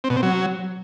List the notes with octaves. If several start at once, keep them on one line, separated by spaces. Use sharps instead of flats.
C4
B2
C4
F#3